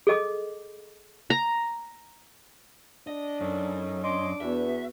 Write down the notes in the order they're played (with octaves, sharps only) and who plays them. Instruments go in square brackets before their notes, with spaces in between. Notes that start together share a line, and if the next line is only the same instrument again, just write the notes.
[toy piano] G#4 A4 D#5 D6 D#6
[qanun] A#5
[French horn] D4 [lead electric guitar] D#5
[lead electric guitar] F#2 [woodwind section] A3 C#4 D#4
[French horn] D4 [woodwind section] C#5 D#5 C6 [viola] D6
[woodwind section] E2 [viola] B3 F#4 [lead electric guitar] E5